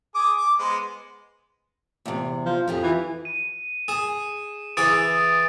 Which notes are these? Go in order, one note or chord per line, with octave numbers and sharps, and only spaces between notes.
G#4 D6 D#6
D6
G#3 B3 C5
E2 C3
F3
F2 F3 G4 G#4
E3
D#7
G#4 E7
E3 G#4 B4 D#6 A6 D7